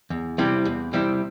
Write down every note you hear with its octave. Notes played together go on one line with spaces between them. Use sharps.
E2
C3 G3 C4 E4
E2
C3 G3 C4 E4